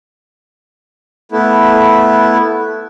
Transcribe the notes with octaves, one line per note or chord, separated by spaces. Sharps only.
A3 B3 E4